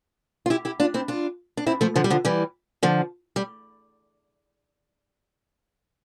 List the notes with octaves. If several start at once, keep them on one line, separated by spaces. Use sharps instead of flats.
F4
E4 G4
E4 G4
D4 F4
C4 E4
D4 F4
D4
C4 E4
F3 A3
D3 F3
G3
D3 F3
E3 G3
D3 F3
G3